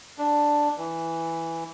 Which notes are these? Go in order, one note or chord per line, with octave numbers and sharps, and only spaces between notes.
D4
E3